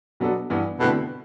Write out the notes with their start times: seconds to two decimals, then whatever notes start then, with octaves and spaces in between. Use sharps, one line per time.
0.20 B2 F#3 B3 D4 A4
0.50 G2 E3 B3
0.80 B2 D3 A3 C4 E4 A4